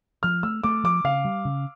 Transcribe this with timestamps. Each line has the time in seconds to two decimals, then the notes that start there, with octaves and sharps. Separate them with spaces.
0.23 F3 F6
0.43 A3 E6
0.63 A3 D6
0.84 F3 D6
1.04 C#3 F5
1.25 G3
1.45 C#3